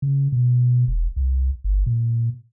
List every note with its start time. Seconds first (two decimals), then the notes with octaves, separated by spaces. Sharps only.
0.02 C#3
0.32 B2
0.88 E1
1.16 C2
1.64 G1
1.86 A#2